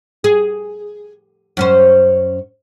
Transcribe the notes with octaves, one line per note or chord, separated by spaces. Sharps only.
G#4
F#2 C#4 C5